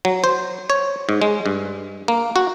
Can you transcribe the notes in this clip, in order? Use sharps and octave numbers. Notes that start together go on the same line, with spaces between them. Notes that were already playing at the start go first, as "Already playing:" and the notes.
F#3
C5
C#5
G#2
G#3
G2
A#3
F#4